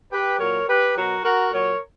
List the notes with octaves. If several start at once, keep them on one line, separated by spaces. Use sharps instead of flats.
G4 B4
A#2 F#3 A#4 C#5
G4 B4
B2 F#3 F#4 A#4
F#4 A#4
A#2 F#3 A#4 C#5